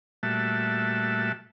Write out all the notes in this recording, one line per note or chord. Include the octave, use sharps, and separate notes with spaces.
A#2 G3 A3 F#4 E5 A5